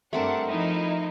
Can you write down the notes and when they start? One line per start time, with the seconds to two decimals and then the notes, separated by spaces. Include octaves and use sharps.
0.13 G2 A3 C4 D4 A#4 F#5
0.48 F3 D#4 E4